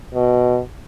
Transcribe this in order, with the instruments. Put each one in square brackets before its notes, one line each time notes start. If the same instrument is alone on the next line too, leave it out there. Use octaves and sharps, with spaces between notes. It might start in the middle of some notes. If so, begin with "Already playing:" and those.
[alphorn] B2